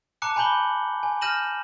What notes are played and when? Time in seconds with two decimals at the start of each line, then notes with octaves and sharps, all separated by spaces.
0.22 A5 A#5 D6 F#6 C#7
0.36 G#5 B5 D6 G6 F#7 G7
1.03 G#5
1.21 F6 G6 A#6 D#7 E7 F#7